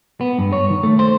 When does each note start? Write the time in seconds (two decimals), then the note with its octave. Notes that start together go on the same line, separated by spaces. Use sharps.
0.21 B3
0.39 G2
0.52 C#5
0.70 D#3
0.83 A3
0.99 C5